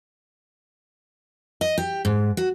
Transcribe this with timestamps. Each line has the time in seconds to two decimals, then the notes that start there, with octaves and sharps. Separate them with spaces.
1.61 D#5
1.78 G4
2.05 G#2
2.37 F#4